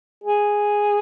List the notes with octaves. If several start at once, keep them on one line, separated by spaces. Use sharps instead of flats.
G#4